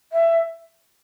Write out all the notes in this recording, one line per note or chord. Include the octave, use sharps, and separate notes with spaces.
E5